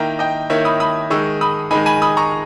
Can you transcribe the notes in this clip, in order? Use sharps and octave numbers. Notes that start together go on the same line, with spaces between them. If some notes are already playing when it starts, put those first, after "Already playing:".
Already playing: D#3 A#3 E4 G5 A#5
D#5 G5
D#3 A#3 E4 C#5 E5
B5 D#6
B5 D#6
D#3 G#3 D#4 C#6 E6
B5 D#6
D#3 G#3 D#4 G#5 B5
G#5 B5
B5 D#6
A#5 C#6